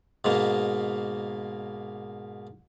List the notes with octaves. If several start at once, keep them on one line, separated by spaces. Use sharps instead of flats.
G#2 B2 A#3